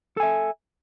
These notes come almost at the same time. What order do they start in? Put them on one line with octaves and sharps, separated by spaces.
A4 G#5 E5